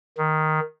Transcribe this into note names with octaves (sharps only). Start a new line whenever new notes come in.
D#3